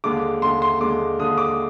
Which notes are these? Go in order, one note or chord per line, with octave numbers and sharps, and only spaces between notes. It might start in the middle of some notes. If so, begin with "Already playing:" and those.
D#2 D3 G#3 D6
D#2 D3 G#3 C6
C6
D#2 D3 G#3 D6
D#2 D3 G#3 D#6
D6